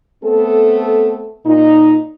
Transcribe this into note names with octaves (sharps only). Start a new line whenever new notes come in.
A3 B3 C4 A4
A#2 D#4